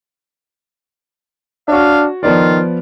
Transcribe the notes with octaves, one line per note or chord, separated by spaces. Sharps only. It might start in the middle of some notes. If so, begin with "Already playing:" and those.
D4 F#4 C#5 F5
D#3 F3 B3 F4 D5